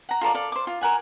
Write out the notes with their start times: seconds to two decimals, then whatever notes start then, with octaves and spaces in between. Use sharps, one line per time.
0.09 F#5 A#5
0.21 F4 A4 A#4 D5
0.34 A4 D5 F5
0.52 C5 D6
0.67 F4
0.81 A#4 F#5 G#5